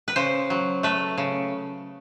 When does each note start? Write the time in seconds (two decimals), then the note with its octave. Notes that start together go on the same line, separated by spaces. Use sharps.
0.08 B4
0.16 C#3 C5
0.50 F#3
0.83 A3 B4
1.18 C#3